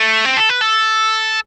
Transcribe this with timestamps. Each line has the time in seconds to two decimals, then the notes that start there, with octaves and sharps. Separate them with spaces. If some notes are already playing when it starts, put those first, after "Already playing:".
Already playing: A3
0.25 C4
0.37 A4
0.50 B4
0.61 A4